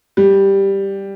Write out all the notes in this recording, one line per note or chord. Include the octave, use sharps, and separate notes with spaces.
G3